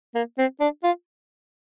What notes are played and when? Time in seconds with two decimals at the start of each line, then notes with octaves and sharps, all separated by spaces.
0.15 A#3
0.38 C4
0.60 D4
0.84 F4